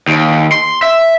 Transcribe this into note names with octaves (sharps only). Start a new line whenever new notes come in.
D#2
C6
E5